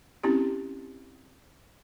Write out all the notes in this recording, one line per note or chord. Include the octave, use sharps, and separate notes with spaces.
C4 C#4 E4 G4